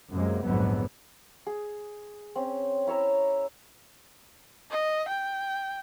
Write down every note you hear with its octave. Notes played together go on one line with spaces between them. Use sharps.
F#2 C3 G#3 A#3
A#1 F2 G#2 D3 F#3 B3
G#4
C4 C#4
E4 C#5 E5 A#5
D#5
G5